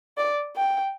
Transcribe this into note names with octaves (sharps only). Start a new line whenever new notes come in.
D5
G5